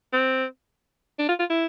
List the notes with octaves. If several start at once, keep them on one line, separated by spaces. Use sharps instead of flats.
C4
D4
F4
F4
E4